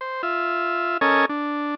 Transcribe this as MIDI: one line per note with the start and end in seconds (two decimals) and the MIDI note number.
0.01 0.22 72
0.23 0.97 65
0.23 0.97 76
1.01 1.25 61
1.01 1.25 69
1.01 1.25 70
1.01 1.25 73
1.01 1.25 75
1.01 1.25 80
1.29 1.75 62